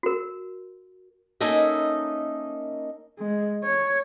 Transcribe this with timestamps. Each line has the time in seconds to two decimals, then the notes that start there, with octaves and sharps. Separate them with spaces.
0.03 F#4 A#4
1.40 A#3 C#4 D#4 A4 D#5 E5
3.19 G#3
3.64 C#5